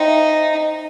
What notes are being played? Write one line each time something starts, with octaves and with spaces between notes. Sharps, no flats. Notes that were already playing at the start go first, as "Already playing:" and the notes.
Already playing: D#4 C5 E5 G5 C6